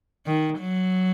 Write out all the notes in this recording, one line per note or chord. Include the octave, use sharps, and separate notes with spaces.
D#3
F#3